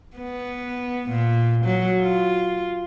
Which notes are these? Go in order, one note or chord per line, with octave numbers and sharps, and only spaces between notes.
B3
A#2
F#3
F4